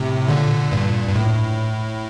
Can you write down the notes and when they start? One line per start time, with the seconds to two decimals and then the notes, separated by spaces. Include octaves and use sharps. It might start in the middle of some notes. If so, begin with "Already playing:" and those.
Already playing: A2 C3
0.28 A#2 D3
0.72 G2 A#2
1.08 G2
1.16 A2